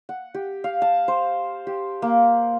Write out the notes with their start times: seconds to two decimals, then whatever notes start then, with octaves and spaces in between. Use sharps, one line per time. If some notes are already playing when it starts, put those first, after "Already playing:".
0.09 F#5
0.34 G4
0.64 F5
0.82 A5
1.08 C5
1.67 G4
2.02 A#3